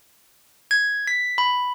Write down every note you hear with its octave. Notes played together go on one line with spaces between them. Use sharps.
G#6
B6
B5